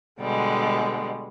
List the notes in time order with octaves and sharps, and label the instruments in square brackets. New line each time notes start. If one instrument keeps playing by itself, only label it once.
[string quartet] B2 D3 G3 G#3